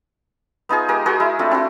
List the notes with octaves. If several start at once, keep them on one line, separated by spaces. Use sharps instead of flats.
B3 D#4 F4 G#4
G#3 G4 A#4
F#4 G#4 A#4 C5
G#3 E4
A3 C4 D4 F4
C4 E4 F#4